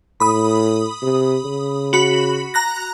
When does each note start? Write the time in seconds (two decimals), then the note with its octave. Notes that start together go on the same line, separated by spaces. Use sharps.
0.20 A2 B5 D#6
1.02 C3
1.45 C#3
1.93 F#4 B5
2.54 A#5 F#6 A#6